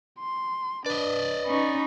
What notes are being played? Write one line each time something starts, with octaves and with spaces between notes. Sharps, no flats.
C6
D4 B4 D5 D#5
C#4 D#4 B5 C#6